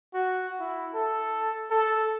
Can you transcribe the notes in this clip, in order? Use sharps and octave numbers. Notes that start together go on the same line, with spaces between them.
F#4
E4
A4
A4